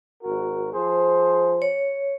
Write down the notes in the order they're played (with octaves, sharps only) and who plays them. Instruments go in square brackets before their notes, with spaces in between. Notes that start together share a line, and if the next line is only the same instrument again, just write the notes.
[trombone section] G#1 F#4 A#4
F3 G#4 C5
[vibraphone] C#5